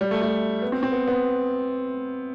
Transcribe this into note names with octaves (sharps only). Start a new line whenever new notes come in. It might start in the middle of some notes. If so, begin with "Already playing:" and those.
G3
A3
A3
B3
C4
C4
B3
B3